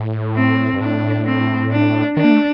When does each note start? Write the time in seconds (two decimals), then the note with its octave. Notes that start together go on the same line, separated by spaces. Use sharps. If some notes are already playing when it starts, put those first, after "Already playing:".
Already playing: A2
0.36 C4
0.74 G2
0.81 A2 D4
1.26 C4
1.71 D4
2.17 D#3 D4
2.24 A#3
2.31 A3